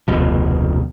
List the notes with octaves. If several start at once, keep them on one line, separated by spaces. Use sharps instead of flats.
F1 D2 B2 F3